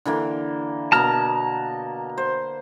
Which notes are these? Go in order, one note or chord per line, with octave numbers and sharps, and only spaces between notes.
D3 E3 A#3
B2 A#3 B3 A5 A#5 F6
C5